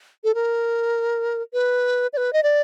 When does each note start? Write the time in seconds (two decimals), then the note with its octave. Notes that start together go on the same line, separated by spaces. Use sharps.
0.24 A4
0.35 A#4
1.54 B4
2.13 D5
2.17 B4
2.33 D#5
2.43 D5